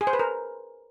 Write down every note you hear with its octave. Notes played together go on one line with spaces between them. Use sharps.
G#4
C5
B4
A#4